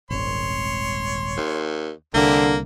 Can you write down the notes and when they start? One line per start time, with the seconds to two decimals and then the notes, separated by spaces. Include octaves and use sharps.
0.10 D#1 G#1 C#5 C6
1.37 D#2
2.14 C2 D3 A#3 C4 E4 G4